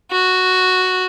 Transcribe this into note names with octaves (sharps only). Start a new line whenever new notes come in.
F#4